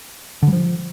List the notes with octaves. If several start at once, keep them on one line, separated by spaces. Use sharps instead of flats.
D3
G3
F3